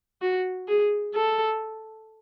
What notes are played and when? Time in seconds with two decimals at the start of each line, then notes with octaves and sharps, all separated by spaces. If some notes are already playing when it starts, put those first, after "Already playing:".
0.22 F#4
0.68 G#4
1.14 A4